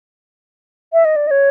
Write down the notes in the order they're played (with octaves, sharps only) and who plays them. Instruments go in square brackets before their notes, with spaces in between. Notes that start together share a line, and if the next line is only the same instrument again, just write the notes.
[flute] E5
D#5
D5
D#5
C#5